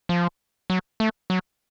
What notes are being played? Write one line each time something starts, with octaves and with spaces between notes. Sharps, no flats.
F3
F#3
A3
F#3